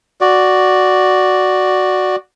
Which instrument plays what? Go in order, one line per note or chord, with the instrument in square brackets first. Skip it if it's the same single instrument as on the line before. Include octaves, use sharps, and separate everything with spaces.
[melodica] F#4 D5